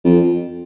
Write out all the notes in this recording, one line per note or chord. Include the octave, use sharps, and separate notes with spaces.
F2